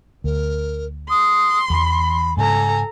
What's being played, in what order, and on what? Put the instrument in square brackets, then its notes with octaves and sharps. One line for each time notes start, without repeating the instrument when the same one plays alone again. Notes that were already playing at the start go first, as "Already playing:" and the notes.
[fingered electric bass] D2 [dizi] A#4
[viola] C6 [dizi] D#6
[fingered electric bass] E2 E3 [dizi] B5
[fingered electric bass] G#2 C#3 [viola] A4 A#5 [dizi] G#5